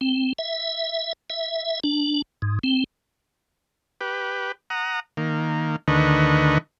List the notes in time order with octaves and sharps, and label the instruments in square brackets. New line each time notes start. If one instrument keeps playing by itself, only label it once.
[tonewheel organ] C4
E5
E5
D4
G#2
C4
[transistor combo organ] G4 B4
F#5 A#5 D#6
D#3 A#3
D2 D3 D#3 B4 D#5 C#6